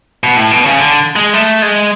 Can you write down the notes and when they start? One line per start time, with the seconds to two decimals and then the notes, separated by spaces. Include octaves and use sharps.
0.24 B2
0.36 A2
0.51 B2
0.65 C#3
0.78 D3
1.16 G#3
1.34 A3
1.62 G#3